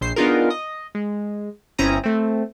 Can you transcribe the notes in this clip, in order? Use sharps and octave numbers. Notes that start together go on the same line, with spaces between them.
A#1 C5 C7
B3 D4 D#4 F4 G#4 A#4
D#5
G#3
G1 C4 C#4 E4 A#5 D#6
A3 C4